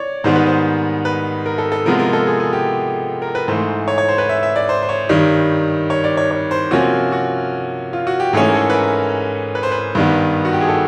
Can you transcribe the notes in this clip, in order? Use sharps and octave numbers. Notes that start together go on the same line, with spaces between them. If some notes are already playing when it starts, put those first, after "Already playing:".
Already playing: C#5 D5
G#2 D#3 G3 B3 C5
B4
C5
B4
A#4
A4
A4
C3 F3 G#3 B3 A#4
A#4
A4
G#4
G#4
G4
A#4
B4
G#2 E3 A3 C5
C#5
C#5
C5
B4
E5
E5
D5
C5
C5
C#5
G2 D#3 G3
C#5
D5
C#5
C#5
C5
C3 F3 A#3 C#4 F#4
F#4
F4
F#4
G4
G#2 E3 A3 C#4 G#4
A#4
A4
B4
A#4
B4
C5
B4
G2 D#3 G3 B3
F#4
G4
G#4
A4